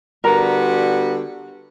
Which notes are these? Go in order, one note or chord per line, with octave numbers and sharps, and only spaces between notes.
D3 G3 B3 F#4 A#4 A#5